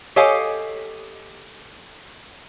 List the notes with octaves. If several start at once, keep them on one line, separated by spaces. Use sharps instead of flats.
G4 A4 C#5 D#5 F5 G#5